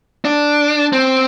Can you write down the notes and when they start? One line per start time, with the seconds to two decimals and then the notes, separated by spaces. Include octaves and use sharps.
0.25 D4
0.93 C4